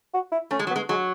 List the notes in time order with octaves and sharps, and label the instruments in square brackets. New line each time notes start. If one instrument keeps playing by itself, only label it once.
[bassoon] F#4
E4
[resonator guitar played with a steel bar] A3 [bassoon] C#4
[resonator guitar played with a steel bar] G#3
F#3
[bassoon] B3
[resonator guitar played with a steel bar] G#3
[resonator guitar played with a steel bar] F#3 [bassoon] G#3